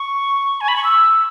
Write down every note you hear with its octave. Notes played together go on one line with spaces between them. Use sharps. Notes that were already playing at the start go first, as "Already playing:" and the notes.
Already playing: C#6
G#5
B5
C#6
E6